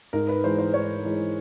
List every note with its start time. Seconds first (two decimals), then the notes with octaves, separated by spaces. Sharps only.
0.13 G#2 A#4
0.28 B4
0.43 E3 G#3 C5
0.58 C5
0.74 G#2 C#5
1.04 E3 G#3